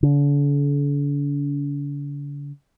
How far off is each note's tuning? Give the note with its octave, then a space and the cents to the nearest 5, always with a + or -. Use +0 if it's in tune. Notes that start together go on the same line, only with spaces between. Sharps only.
D3 -45